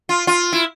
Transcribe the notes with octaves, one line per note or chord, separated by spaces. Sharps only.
F4
F4
E4